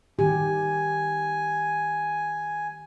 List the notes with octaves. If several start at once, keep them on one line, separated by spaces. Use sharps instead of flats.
D#3 G4 G#5